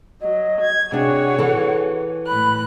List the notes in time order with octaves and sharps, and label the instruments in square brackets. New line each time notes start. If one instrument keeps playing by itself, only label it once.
[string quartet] F#3 [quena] D#5
[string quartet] G#6
[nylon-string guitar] C3 D4 [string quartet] F#4 G#4 C#5 [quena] F#5
[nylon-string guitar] E3 A4
[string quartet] A2 F#6 [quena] B5